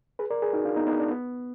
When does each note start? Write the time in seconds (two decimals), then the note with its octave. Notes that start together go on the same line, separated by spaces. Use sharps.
0.19 G#4 B4
0.30 A#4 D5
0.42 G#4 B4
0.53 D#4 F#4
0.65 D4 F4
0.76 B3 D#4
0.87 B3 D#4
0.99 D4
1.11 B3